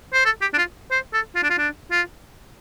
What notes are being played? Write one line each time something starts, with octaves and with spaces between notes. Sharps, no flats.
C5
A4
G4
D4
F4
C5
A4
F4
D4
F4
D4
F4